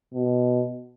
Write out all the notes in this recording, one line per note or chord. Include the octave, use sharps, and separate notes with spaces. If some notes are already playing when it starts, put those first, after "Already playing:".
B2